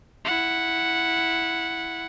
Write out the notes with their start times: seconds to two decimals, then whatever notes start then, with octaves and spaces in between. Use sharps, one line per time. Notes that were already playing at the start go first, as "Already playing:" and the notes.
0.25 E4 F#5